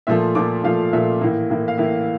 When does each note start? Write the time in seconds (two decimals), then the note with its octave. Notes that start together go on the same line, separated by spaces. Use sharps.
0.07 A#2 F3 A3 E5
0.35 A#2 F3 A3 D6
0.63 A#2 F3 A3 F5
0.93 A#2 F3 A3 E5
1.21 A2 E3 A#3
1.50 A2 E3 A#3
1.68 F5
1.78 A2 E3 A#3 E5